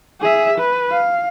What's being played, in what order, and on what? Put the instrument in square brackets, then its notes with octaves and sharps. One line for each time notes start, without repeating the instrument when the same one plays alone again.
[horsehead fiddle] G#4 E5
B4
F5